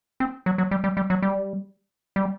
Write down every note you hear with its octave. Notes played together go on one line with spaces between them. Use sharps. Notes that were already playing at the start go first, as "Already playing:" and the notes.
C4
F#3
F#3
G3
G3
G3
F#3
G3
G3